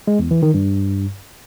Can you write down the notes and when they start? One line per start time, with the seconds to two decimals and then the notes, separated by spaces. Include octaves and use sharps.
0.07 G#3
0.19 E2
0.31 E3
0.43 D#3
0.54 G2